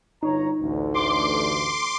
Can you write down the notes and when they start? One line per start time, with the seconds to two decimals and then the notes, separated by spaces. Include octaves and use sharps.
0.23 G1 D#4 C#5 A#5
0.61 A1 D2
0.94 C6 D6